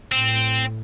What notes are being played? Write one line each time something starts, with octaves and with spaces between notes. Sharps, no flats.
A2 C4